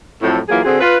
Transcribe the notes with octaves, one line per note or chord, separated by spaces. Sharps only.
F2 A2 F#3 A4
E3 F#3 A#3 F4 G#4
D3 C4 F#4 G#4
F4 B4